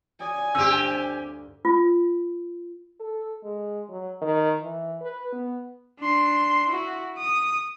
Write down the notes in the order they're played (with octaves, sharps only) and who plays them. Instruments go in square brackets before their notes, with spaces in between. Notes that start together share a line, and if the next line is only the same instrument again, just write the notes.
[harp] F#4 D5 D#6 [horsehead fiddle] G#5
[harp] D2 G2 F5 [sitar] C4 G4 [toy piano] E6
[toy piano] F4
[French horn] A4
G#3
F#3
D#3
E3
B4
B3
[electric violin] D4 C6
E4 F#4
D#6